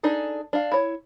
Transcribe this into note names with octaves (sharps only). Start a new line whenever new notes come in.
D4 D#4 G#4 A4
D4 F5
E4 C#5